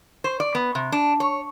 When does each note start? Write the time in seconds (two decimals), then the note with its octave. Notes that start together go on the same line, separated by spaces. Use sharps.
0.24 C5
0.40 D5
0.55 B3
0.75 C3
0.92 D4
1.20 C#5